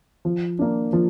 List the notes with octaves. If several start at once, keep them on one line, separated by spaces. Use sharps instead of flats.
F3
A#3 D4
F3